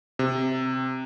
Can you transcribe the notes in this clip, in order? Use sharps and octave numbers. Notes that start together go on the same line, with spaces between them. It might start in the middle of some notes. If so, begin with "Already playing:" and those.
C3